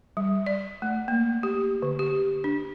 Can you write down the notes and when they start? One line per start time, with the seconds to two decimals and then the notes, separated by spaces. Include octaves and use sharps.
0.17 G3
0.46 D5
0.82 A3
1.08 A#3
1.43 G4
1.82 D3
1.99 G4
2.44 D4